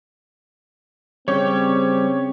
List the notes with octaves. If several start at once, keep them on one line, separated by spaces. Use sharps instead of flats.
C#3 G3 C4 G4 C#5